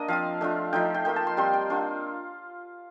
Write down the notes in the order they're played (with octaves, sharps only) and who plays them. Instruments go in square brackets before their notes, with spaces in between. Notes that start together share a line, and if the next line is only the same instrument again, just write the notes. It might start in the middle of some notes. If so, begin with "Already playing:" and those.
Already playing: [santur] A#3 D4 D#5
F3 C4 F4 F5
A3 D4 F4
F3 A3 D#4 G5
G5
A#3 F4 G5
A5
C6
G3 C4 F4 C6
G5
A#3 D4 F4